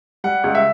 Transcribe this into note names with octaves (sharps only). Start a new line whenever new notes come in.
G3 F#5
C#2
E5